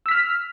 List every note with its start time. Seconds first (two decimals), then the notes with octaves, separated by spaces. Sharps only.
0.06 E6
0.09 B6
0.11 F6